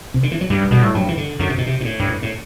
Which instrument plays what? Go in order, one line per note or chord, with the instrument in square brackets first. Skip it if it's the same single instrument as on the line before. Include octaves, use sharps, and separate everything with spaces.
[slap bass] C3
D3
E3
F#3
[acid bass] G2 [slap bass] G3
[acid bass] B2 [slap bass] G3
[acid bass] A2
[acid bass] G2 [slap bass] F#3
[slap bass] E3
D3
[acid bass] F#2 [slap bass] D3
[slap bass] C3
B2
C3
B2
A2
[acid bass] G2
[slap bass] A2